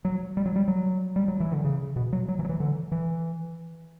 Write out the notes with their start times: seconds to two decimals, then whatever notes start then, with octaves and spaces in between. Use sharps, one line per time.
0.05 F#3
0.37 G3
0.46 F#3
0.56 G3
0.68 F#3
1.16 G3
1.28 F#3
1.40 E3
1.51 D3
1.64 C#3
1.96 B2
2.13 F#3
2.28 F#3
2.39 E3
2.45 F#3
2.49 E3
2.60 D3
2.92 E3